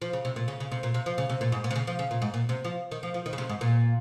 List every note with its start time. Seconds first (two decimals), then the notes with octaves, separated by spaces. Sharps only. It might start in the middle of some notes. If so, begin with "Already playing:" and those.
0.02 F3
0.13 C#3
0.25 C3
0.36 A#2
0.48 C#3
0.60 C#3
0.71 C3
0.83 A#2
0.94 C3
1.06 F3
1.18 C#3
1.29 C3
1.41 A#2
1.52 G#2
1.64 A#2
1.71 C3
1.76 C#3
1.87 F3
1.99 C#3
2.11 A#2
2.22 G#2
2.34 A#2
2.49 C3
2.64 F3
2.91 D#3
3.03 F3
3.14 F3
3.26 D#3
3.33 C#3
3.38 C3
3.49 G#2
3.61 A#2